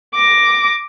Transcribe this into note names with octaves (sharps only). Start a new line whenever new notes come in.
D6 A#6